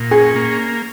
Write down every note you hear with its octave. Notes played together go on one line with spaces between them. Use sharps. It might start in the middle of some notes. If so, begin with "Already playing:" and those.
Already playing: A#2
C#4 G#4
A#3